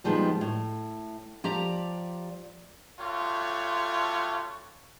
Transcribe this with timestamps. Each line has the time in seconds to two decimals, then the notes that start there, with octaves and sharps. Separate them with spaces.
0.04 A#2 D#3 F3 G3 G#3 B3
0.41 A2
1.44 F3 G4 D5 A#5
3.00 G3 A3 F4 F#4 C#5